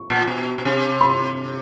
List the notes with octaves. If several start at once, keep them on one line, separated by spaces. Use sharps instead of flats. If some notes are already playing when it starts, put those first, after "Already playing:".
Already playing: C#6
A#2
B2
B2
C3
C6